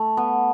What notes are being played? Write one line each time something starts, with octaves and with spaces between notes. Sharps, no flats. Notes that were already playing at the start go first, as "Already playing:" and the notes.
Already playing: A3
B3